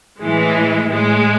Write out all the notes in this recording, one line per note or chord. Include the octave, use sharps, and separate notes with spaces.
A2 E3 G#3
A2 G#3